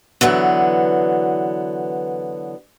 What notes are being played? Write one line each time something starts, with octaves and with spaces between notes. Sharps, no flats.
D3 E3 F#3 B3